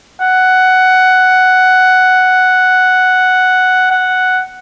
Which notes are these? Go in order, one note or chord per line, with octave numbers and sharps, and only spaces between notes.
F#5
F#5